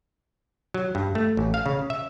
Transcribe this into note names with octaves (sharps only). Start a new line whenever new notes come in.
F#3
G2
A3
A1
F5
C#3
E5